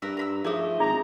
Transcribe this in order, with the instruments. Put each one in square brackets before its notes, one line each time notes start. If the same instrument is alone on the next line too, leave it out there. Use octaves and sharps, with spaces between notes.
[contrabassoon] G2 [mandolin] A#4 B4 E5
[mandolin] A#5 B5 E6
[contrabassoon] F3 [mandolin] A3 C5 D#5 [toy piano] D#4 G#4
[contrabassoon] G#1 [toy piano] D4 D#4 G#4 [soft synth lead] A#5